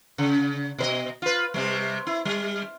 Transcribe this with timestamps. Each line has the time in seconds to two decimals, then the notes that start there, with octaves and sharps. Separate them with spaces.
0.18 C#3
0.78 B2 B4 D#5
1.22 F4 B4
1.54 C3 G3
2.07 E4
2.25 G3